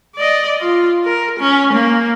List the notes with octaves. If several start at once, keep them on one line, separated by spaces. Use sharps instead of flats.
D5 D#5
F4
A#4
C#4
A#3